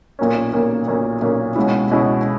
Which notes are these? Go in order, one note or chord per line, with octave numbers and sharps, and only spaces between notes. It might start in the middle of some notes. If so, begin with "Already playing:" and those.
B1 A#2 A#3 C#4
B1 A#2 A#3 C#4
B1 A#2 A#3 C#4
B1 A#2 A#3 C#4
C#2 B2 G#3 C#4 E4
C#2 B2 G#3 C#4 E4